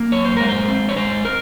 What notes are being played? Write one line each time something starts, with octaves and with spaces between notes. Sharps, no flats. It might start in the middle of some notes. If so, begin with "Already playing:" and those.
Already playing: A#3
F#2 C#5
C5
G#3 A#4
C5
C4
C#5
G#3 C5
A#4